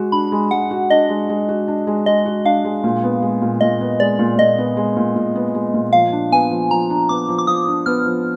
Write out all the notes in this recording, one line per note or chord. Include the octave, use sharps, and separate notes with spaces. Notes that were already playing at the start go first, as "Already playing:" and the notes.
Already playing: G#3 F#4
D4 B5
G#3
G#3 F#5
F#4
D4 D#5
G#3
G#3
F#4
D4
G#3
G#3 D#5
F#4
D4 F5
G#3
A#2
B3
G#3
A#2
A#2 D#5
B3
G#3 D5
A#2
A#2 D#5
B3
G#3
A#2
A#2
B3
G#3
A#2
F3 F5
D4
B3 G#5
F3
F3 A#5
D4
B3 D6
F3
D6
F3 D#6
D4
B3 F6
F3